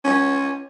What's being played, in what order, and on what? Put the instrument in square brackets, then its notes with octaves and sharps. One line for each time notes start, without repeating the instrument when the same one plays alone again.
[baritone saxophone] C#4